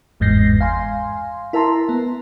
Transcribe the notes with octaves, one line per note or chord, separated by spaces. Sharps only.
G1 E2 G#2 G6 A#6 C7
F5 G#5 C6
E4 A#4 E5 A5 A#5 C6
B3